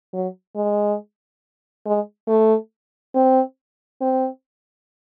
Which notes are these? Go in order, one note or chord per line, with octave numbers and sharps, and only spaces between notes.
F#3
G#3
G#3
A3
C4
C4